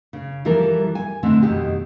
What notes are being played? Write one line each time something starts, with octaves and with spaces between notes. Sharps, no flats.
C#3
E3 F3 G3 A4 A#4
G#5
D3 E3 A3 C4 D#4
F2 B2 D#3 G4